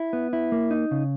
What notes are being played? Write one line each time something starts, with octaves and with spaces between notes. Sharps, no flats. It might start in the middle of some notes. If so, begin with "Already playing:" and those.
Already playing: E4
B3
E4
A#3
D#4
C#3